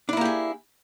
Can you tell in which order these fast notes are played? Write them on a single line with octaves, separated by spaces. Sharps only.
D4 E4 A#3 G4 G#4